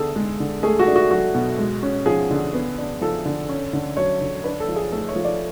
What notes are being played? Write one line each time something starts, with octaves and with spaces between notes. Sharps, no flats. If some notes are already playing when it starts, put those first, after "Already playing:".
Already playing: D3 B3 G#4 A4
G#3
D3
A3 G#4
F#4
D4
F#4
F#3 F#4
B2
G#3
C#4
F3 G#4
D3
B3
D4
F3 A4
D3
C#4
D3
F#3 C#5
D3
D4 B4
A4
F3
G#4
A3 A4
C#5
F3
D5